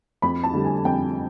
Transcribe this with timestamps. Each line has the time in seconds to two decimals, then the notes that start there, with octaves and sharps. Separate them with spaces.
0.22 F2 B5
0.43 A5
0.54 D3 G3
0.65 G#5
0.85 F2 G5